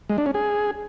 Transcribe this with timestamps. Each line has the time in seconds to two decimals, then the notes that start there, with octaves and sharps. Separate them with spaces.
0.09 G#3
0.18 D4
0.26 C#4
0.34 G#4